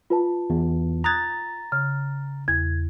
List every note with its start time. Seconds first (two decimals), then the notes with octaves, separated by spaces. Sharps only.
0.10 F4 B4 A5
0.50 E2
1.04 A#5 D#6 F#6 G#6 A6
1.72 C#3 F6
2.48 E2 G#6